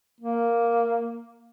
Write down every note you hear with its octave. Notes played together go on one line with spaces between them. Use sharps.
A#3